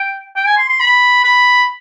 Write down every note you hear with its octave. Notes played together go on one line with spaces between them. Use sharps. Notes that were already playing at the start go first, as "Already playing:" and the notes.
Already playing: G5
G5
G#5
C6
C6
B5
B5